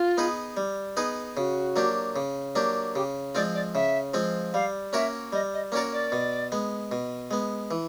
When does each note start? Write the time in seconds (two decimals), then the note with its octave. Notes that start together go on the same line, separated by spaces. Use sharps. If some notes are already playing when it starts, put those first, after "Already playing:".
Already playing: F4
0.17 B3 D#4 G#4 B4
0.57 G3
0.97 B3 D#4 G#4 B4
1.37 C#3 F#4
1.76 F#3 A#3 D4 G4
2.16 C#3
2.55 F#3 A#3 D4 G4
2.95 C#3 G4
3.34 F3 G#3 C4 F4 D5
3.54 D5
3.74 C#3 E5
4.14 F3 G#3 C4 F4
4.53 G3 F5
4.93 A#3 C#4 F#4 A#4 E5
5.33 G3 D#5
5.53 D#5
5.72 A#3 C#4 F#4 A#4 D5
5.92 D5
6.12 B2
6.52 G#3 B3
6.92 B2
7.31 G#3 B3
7.71 E3